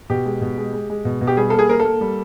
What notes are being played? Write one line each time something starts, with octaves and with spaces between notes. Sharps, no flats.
B2 G4
G#3
B2
G#3
G#3
G#3
B2
B2
G4
G3 G#4
A#3 A4
G#4
A#3 A#4
A4
A#3
G3